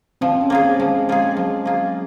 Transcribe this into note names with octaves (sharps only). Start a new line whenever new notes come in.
F3 C4
C#4
A#3 F4 G#4
C4
F3 G#3
A#3 F4 G#4
F3 F#3
A#3 F4 G#4